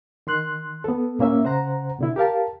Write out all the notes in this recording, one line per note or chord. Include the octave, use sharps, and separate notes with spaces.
D#3 C6 F#6
B3 A4
A#2 A#3 C#4 E5
C#3 C5 F#5 A#5
B2 D3 E4
G4 A#4 F5 A5